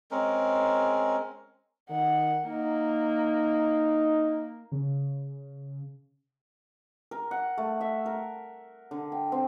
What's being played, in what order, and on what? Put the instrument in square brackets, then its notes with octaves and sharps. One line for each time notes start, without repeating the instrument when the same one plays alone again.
[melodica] G#3 C4 C#4 A#4
[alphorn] D#3 [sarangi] F#5
[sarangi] A#3 [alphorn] D#4
[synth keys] C#3
[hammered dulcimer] A#4
F#5
A3
E5
A#4
D3
G5
C4